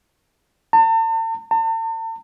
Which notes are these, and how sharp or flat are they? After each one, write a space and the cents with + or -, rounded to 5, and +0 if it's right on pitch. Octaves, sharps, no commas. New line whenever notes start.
A5 +40
A5 +40